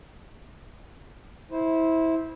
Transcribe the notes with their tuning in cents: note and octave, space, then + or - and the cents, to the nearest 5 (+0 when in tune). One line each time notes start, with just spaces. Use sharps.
E4 -20 C5 +0